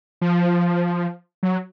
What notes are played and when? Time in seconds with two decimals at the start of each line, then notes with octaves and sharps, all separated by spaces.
0.21 F3
1.43 F#3